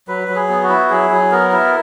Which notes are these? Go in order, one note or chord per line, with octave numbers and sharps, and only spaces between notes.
F#3 B4
F#3
G#4
B3
F#4
E4
F#3 G#4
F#3
B3 A#4
E4